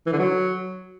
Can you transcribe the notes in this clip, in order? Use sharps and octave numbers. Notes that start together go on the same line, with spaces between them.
E3
D3
F#3